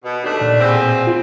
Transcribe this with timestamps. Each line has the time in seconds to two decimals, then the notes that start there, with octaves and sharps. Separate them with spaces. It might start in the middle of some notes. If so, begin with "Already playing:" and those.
0.03 B2
0.23 D#2 A3 D4
0.41 A#2
0.60 E2 B2 C4
1.07 F4